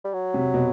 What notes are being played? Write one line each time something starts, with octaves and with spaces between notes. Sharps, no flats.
G3
F#3
C3
B2